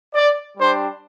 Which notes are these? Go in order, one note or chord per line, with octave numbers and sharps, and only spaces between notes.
D5
G3 D4 G4 C5